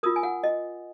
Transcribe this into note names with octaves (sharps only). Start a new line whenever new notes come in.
F4 A#4 D#6
G#5
F#5
D#5